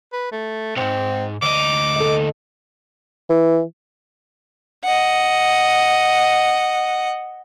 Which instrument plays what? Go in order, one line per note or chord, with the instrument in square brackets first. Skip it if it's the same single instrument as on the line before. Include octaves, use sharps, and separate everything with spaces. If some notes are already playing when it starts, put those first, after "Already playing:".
[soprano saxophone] B4
A3
[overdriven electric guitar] B1 G#2 [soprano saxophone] C4
[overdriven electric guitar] D2 D#4 [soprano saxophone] D6
[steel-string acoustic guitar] A4 D#5
[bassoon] E3
[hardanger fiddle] D#5 F#5